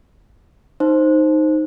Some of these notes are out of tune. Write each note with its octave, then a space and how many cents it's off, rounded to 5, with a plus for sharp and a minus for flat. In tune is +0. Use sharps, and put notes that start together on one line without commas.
D#4 +0 C5 +5